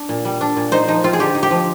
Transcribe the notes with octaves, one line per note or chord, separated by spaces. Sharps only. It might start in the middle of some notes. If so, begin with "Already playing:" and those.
Already playing: D4
A#2
G3
D4
A#2
D#4 C5
F3 D#4
C4 F4
G#4
D3 G4
D#4
G4
F3